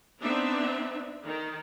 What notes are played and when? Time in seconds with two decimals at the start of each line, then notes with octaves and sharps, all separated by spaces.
0.22 B3 C4 D4 D#4 E5
1.25 D#3